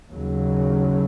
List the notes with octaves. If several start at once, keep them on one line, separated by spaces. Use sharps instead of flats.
D#2 C#3 F#3